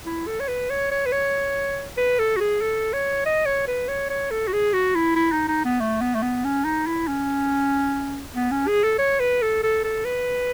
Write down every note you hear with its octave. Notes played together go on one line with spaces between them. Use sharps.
E4
A4
C#5
B4
C#5
C#5
B4
C#5
B4
A4
F#4
G#4
A4
C#5
D#5
C#5
B4
C#5
C#5
A4
F#4
G#4
F#4
E4
E4
D#4
D#4
B3
A3
B3
A3
B3
C#4
D#4
E4
C#4
B3
C#4
G#4
A4
C#5
B4
A4
A4
A4
B4